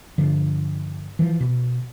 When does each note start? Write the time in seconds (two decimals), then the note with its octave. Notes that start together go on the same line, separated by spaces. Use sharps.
0.18 G2 D3 F3
1.19 E3 F3
1.40 B2